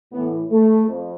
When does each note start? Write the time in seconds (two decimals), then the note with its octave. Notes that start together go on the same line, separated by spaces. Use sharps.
0.12 A2 E3 B3
0.50 A3
0.87 F2